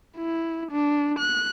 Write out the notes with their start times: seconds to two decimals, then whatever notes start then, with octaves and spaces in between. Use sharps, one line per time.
0.17 E4
0.72 D4
1.19 F#6